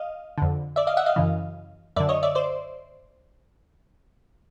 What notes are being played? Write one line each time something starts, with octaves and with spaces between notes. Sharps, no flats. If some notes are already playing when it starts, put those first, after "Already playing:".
Already playing: D#5 F5
F2 D3
D5 E5
D#5 F5
E5 F#5
D#5 F5
F#2 C#3 E3
F#2 D3 D5 E5
C#5 D#5
D5 E5
C5 D5